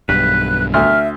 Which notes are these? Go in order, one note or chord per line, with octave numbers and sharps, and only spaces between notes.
B1 G2 B4 F#6
D2 E5 F6